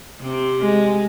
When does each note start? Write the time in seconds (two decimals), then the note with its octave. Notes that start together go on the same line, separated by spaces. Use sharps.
0.21 C3 C4
0.61 G#3